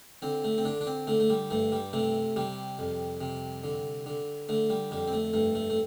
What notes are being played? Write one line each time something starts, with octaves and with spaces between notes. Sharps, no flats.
D3 C4
A3
C4
D3 D4
D4
C4
D3 A3
A3
G3
G2 A3
G3
C3 A3
C3 G3
F2
C3
D3
D3
D3 A3
G3
F2 G3
C4
A3
G2 A3
A3
A3